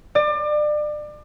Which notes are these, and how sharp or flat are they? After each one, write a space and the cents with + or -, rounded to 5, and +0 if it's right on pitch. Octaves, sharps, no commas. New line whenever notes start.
D5 +30